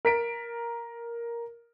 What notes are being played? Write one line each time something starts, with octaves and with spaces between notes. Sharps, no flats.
A#4 B6 D7